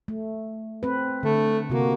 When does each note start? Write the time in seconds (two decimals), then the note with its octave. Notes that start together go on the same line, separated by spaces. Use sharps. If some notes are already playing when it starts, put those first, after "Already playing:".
0.08 A3
0.83 C4 B4
1.23 D3 A3
1.70 C3 A#3 F#4